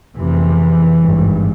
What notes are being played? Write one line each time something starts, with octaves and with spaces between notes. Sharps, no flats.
F1 F2 C3 E3
G#1 G2